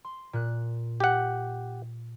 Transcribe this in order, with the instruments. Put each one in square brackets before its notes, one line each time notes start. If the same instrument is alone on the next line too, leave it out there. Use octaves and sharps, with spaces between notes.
[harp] C6
A#2 F#6
[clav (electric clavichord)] G4 F#5